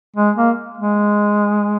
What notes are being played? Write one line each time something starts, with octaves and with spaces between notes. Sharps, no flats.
G#3
A#3
G#3